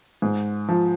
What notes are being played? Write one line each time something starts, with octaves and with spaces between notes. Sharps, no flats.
G#2
F3